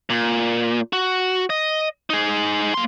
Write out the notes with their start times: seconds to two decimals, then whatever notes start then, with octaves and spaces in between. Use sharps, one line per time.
0.10 A#2
0.93 F#4
1.50 D#5
2.10 D#4 G#4
2.74 A#3 C6